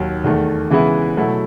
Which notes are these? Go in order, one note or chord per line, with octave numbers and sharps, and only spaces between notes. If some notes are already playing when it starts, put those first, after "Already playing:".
Already playing: D#2 D#3 F#3
E2 D#3 A3
C#3 E3 G#3 B3 E4
B2 F#3 A3 E4